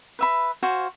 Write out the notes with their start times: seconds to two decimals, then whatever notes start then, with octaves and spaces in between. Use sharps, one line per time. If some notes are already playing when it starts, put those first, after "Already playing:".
0.19 B4 E5 B5
0.63 F#4 C5 F5 G#5